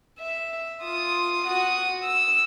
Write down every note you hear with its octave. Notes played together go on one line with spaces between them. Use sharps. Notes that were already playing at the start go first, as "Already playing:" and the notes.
E5
F4 D#6
F#4 D#6
E6